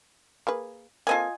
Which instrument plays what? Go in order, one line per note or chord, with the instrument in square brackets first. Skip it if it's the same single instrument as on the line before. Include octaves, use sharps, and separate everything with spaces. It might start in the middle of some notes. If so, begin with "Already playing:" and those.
[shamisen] A#3 G#4 B4
[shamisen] A#3 C4 A4 [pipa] F4 D#5 G#5